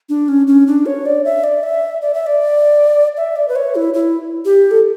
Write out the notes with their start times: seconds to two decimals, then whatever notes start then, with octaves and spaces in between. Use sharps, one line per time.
0.09 D4
0.28 C#4
0.47 C#4
0.67 D4
0.86 C#5
1.06 D5
1.25 E5
1.44 D5
1.63 E5
2.02 D5
2.14 E5
2.27 D5
3.17 E5
3.36 D5
3.48 B4
3.56 C#5
3.75 E4
3.94 E4
4.45 G4
4.71 A4